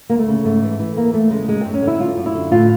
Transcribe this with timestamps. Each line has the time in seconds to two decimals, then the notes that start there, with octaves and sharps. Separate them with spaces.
0.09 D2 A#3
0.19 A3
0.28 C#3
0.45 G#2 A3
0.62 E3
0.79 E3
0.97 E2 A#3
1.13 E2 A3
1.30 C#3 G#3
1.48 F#2 G#3
1.61 F#2 C4
1.74 C#4
1.82 D3 E4
1.99 F#2 F4
2.17 F#2
2.26 E4
2.34 D3
2.51 A2 F4